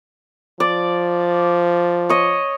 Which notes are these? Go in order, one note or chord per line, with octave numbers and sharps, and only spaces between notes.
F3 D5
C#5 D#5